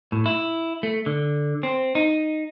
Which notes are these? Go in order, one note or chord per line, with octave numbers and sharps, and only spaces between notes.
A2
E4
A3
D3
C4
D#4